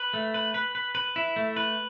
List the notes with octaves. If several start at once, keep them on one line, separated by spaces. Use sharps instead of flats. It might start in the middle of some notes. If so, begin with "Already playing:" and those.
Already playing: B4
A3
B4
B4
B4
B4
E4
A3
B4